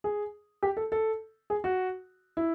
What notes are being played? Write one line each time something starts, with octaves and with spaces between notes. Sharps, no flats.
G#4
G4
A4
A4
G#4
F#4
E4